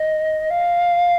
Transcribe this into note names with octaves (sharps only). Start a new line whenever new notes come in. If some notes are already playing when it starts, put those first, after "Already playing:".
Already playing: D#5
F5